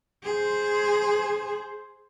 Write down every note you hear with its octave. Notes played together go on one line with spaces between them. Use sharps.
G#4 C5